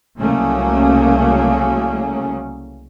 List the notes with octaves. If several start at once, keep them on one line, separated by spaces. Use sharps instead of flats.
C2 C#3 F#3 A3 A#3 C#4